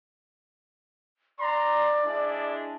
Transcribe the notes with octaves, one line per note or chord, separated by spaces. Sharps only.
D5 A#5 C6
G#3 D4 E4